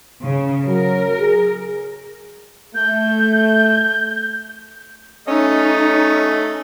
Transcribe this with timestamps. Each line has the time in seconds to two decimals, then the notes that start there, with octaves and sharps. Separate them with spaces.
0.24 C#3
0.67 F#3 A#4
1.20 G#4
2.75 A3 G6
5.28 A3 C#4 D#4 D#5